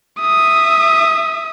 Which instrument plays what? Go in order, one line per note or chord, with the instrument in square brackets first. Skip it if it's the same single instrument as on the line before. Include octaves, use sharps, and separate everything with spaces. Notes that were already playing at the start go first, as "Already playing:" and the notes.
[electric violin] E5 D#6